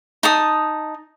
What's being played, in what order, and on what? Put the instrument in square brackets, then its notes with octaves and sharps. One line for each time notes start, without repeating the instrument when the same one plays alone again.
[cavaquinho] D#4 A5 D#6